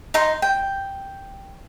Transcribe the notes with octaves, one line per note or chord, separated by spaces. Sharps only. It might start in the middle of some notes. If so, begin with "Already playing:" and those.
D#4 C6
G5